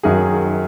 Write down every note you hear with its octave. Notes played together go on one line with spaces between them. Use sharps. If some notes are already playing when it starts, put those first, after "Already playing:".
F#2 D#3 G#4